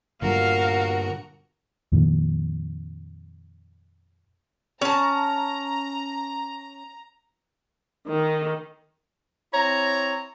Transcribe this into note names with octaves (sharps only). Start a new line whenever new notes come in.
G2 A#2 D3 G3 F#4 A#4 F5
F2 A#2 D#3
C#4 A5 A#5
D#3
C4 E4 C#5 A#5